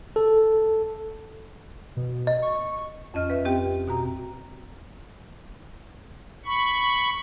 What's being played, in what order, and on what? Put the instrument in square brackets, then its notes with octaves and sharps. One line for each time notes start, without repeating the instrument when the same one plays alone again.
[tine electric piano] A4
[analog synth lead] B2
[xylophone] D#5
[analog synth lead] C#6
[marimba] F2 C#4 D#5 F6
B4 E5
C4 G4 G5
B2 F#4 A#5
[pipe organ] B5 C#6